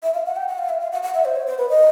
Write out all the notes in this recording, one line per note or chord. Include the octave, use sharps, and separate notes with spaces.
E5
F5
F#5
G5
F#5
F5
E5
F5
F#5
F#5
E5
C5
C#5
C5
B4
D#5